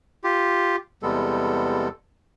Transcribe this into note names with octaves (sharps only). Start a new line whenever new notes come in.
F4 G4
E2 C3 G3 G#3 B3 A4